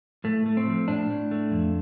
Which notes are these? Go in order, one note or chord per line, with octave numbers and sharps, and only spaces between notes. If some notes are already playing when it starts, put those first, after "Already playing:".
A2 A3
A3
C4
F3
A2 D4
A2
A3
F2